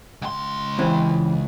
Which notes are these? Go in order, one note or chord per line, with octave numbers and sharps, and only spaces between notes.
C#2 C6
E3 C4